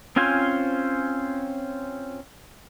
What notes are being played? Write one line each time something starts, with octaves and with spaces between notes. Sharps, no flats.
C4 C#4 F4 C5 G#5